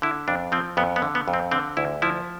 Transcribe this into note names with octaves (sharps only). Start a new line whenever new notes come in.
D3 E4
F2 D4
F3 C4
F2 B3
B3
D3
B3
F2
C4
D3 C4
D2 E4
F3 E4